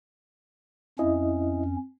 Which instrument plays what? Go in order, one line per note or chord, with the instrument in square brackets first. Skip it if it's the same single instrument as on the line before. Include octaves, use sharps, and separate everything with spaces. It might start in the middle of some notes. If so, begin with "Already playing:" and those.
[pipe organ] F2 C#4 [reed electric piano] E4 D#5